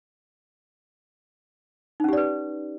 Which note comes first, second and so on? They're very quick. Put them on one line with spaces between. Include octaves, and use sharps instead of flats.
D#4 C#4 G4 D5 B4